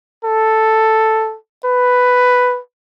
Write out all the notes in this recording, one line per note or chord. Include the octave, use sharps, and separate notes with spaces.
A4
B4